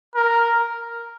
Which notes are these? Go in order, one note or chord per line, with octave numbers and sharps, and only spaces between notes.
A#4